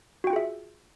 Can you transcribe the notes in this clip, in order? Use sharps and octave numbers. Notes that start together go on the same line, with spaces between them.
F4 F#4 G#4 E5 G5